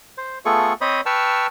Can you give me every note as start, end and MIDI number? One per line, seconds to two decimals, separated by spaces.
0.18 0.38 72
0.45 0.73 57
0.45 0.73 59
0.45 0.73 65
0.45 0.73 68
0.45 0.73 69
0.45 0.73 85
0.81 1.01 60
0.81 1.01 72
0.81 1.01 73
0.81 1.01 75
0.81 1.01 83
0.81 1.01 87
1.06 1.47 71
1.06 1.47 79
1.06 1.47 81
1.06 1.47 85
1.06 1.47 88
1.06 1.47 89